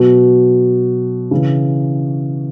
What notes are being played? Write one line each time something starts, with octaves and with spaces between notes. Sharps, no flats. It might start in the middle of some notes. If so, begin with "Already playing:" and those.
Already playing: B2 F#3
C#3 E3